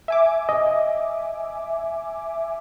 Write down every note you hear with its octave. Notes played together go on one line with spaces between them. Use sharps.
E5 G#5 D6
D#5